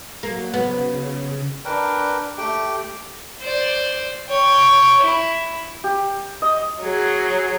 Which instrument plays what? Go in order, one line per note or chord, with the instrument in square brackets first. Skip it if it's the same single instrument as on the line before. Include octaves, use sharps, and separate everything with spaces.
[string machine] F#3 F#4 [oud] A#3
[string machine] C#3 [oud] B3
[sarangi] D4 [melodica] A#4 B4 G5
[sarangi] A3 [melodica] G4 G5
[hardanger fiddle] C5 D5
C#5 G5
E4
[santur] G4
D#5
[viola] F#3 G#4